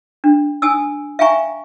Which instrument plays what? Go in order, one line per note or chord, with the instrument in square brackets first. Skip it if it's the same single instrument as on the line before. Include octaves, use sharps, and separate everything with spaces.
[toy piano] D4
G#5 A5 D#6 E6
E5 F5 G5 G#5 A#5 C#6